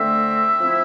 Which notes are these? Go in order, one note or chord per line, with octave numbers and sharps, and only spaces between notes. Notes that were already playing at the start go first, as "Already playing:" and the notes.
Already playing: D3 A3 C4 E5
F3 C4 E4